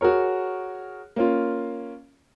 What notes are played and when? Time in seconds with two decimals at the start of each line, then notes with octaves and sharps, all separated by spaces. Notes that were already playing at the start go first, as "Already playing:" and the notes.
0.01 F#4 G#4 A#4 C#5
1.16 A#3 C#4 F4